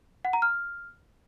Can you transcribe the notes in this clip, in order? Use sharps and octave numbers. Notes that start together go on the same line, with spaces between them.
F#5
A#5
F6